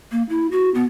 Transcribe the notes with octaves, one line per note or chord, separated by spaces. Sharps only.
A#3
E4
F#4
B3